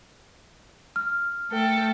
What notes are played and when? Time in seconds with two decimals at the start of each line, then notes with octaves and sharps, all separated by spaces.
0.96 F6
1.50 A3 A4 G5